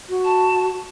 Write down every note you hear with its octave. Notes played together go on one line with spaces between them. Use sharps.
F#4
A5